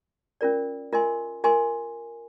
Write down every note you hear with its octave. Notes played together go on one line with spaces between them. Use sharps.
C#4 F4 A#4 D5
F4 A#4 D#5 G#5 C6
F4 A#4 D#5 G#5 C6